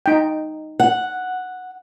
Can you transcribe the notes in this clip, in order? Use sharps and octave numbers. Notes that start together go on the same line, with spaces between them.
D#4 G5
F#5